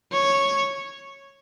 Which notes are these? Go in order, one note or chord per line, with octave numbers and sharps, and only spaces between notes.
C#5